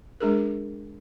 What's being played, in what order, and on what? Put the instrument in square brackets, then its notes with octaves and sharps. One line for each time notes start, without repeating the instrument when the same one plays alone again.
[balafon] G#3 D4 G#4 A#4